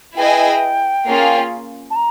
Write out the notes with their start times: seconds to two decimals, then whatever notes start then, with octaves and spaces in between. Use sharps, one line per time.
0.16 E4 G#4 B4 D#5 G5 G#5
1.06 A#3 C#4 F4 G#4
1.90 A5
1.96 A#5